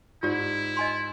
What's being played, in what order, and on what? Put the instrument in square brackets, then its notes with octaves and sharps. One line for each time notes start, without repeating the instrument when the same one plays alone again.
[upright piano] G#2 [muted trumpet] E4 [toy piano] F4 G4 D5
[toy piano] D#5 G#5 C6